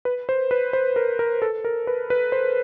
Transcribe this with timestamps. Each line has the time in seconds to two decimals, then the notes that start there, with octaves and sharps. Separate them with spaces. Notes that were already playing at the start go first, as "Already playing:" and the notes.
0.05 B4
0.29 C5
0.51 B4
0.73 C5
0.96 A#4
1.19 A#4
1.42 A4
1.65 A#4
1.87 B4
2.10 B4
2.32 C5